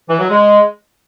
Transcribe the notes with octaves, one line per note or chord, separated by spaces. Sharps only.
E3
F#3
G#3